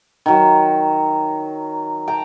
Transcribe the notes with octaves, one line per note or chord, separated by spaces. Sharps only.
D#3 F#3
G5 A5 A#5